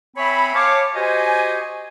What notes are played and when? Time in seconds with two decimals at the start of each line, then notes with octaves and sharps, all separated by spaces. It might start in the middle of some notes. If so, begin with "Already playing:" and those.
0.16 C4 C#5 E5 G#5 B5
0.54 C#5 F5 A5 D6
0.95 F#4 G4 C5 D#5 G#5